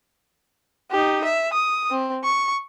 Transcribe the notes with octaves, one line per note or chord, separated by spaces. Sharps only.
D#4 G4
E5
D#6
C4
C#6